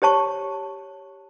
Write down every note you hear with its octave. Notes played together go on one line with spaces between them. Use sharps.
G4 C5 C#5 A5 C#6